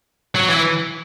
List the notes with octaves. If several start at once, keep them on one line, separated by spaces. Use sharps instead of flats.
F#3
E3